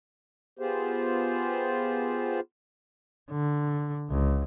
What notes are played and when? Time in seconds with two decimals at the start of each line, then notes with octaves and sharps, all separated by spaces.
0.59 B3 F4 G4 G#4 C5
3.31 D3
4.10 C#2